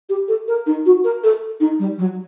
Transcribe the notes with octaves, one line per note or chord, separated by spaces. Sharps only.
G4
A4
A#4
D#4
F#4
A#4
A4
D#4
G3
F#3